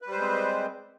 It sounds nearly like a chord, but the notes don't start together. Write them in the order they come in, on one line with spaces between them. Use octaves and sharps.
B4 G3 C5 G#3 C4